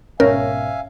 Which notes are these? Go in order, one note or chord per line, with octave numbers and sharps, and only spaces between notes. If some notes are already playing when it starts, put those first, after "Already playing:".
G#1 B2 C#4 A#4 E5 F5 G#5